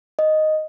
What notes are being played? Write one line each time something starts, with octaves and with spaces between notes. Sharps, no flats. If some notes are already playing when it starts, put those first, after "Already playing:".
D#5